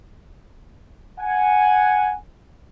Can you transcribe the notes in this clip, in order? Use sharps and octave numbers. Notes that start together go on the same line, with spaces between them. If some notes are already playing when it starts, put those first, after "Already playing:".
F#5 G#5